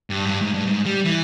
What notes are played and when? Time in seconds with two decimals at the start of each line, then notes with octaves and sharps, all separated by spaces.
0.10 G2
0.25 G#2
0.29 G2
0.42 G#2
0.54 G2
0.67 G#2
0.86 G3
1.05 E3